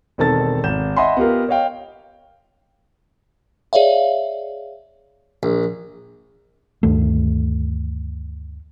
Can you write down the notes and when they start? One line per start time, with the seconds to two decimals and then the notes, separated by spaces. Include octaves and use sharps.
0.18 E1 D#3 C4 A4 A5 A6
0.64 G#1 G6 E7
0.96 D#5 E5 F#5 G#5 B5 C6
1.17 B3 F4 G4 A#4
1.49 C#5 D#5 F5 G5
3.73 G#4 C#5 D5 E5 F5
5.43 A#1
6.83 D2 G2 D#3 A3